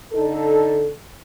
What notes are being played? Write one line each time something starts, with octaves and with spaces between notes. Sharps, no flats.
D3 D#4 A4